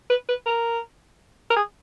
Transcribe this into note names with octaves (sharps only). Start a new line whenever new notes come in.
B4
B4
A#4
A#4
G#4